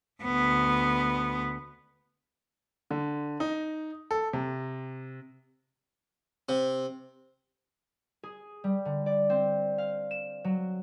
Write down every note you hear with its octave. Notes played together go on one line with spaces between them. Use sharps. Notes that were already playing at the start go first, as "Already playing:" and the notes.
D2 B3
D3
D#4
A4
C3
C3
G#4
G3
D3
D5
C4
F5
E7
F#3